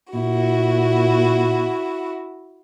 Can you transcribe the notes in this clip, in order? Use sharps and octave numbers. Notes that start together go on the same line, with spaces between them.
A#2 E4 F#4